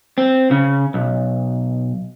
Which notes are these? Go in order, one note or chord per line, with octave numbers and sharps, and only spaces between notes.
C4
C#3
B1